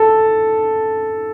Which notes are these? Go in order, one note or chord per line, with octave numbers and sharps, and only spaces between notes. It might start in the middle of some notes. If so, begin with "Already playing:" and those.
Already playing: A4